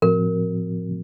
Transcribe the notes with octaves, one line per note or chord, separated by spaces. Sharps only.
A2 F3 C4 F#4 A#4